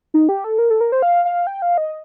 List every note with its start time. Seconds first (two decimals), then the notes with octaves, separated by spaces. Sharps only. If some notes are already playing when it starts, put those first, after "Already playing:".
0.14 D#4
0.29 G4
0.44 A4
0.58 A#4
0.70 A4
0.81 A#4
0.92 C5
1.02 F5
1.25 F5
1.47 G5
1.62 F5
1.78 D#5